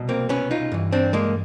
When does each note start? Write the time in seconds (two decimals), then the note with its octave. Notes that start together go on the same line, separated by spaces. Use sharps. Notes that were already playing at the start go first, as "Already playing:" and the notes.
Already playing: C2 B2
0.09 A#3 C4
0.29 B3 C#4
0.51 D#4 F4
0.72 G2 E3
0.92 C4 D4
1.13 G#3 A#3